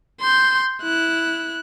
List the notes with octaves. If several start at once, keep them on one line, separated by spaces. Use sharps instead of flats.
C6 G6
E4 F#6